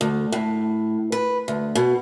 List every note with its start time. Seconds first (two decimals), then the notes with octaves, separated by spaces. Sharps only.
0.01 D2
0.32 A2
1.12 B4
1.48 D2
1.75 B2